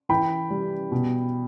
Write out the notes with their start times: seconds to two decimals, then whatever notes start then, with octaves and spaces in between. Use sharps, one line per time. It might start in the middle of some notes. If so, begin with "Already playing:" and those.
0.09 E3 G5 B5
0.50 G3
0.91 B2